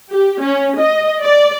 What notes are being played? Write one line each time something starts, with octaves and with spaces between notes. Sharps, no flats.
G4
C#4
D#5
D5